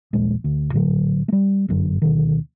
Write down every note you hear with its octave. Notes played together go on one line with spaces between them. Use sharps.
D#1 A#1 G#3
D2
A#1 A2 D3 F#3
G3 A3
G1 F#2 D3
D2 B2 D#3